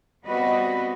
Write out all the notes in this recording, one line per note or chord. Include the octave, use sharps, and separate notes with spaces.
G3 B3 C4 F#4 B4 D#5